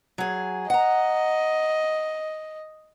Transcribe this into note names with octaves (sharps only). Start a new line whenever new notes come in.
F#3 G#4
D#5 F#5 A#5